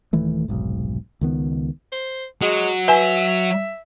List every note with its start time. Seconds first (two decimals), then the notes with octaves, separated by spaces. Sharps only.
0.13 D#1 D#3 E3 A3
0.48 F1 B1 G#2
1.21 C#2 D#3 B3
1.92 C5
2.42 F#3 G#3
2.88 B4 E5 G#5